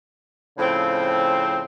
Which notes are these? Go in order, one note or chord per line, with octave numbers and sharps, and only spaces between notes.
A2 C#3 F3 C4